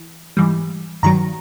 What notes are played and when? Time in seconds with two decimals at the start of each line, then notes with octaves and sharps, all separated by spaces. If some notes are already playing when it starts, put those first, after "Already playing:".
Already playing: E3
0.37 G#2 E3 G3
1.03 G2 D#3 F#3 A#5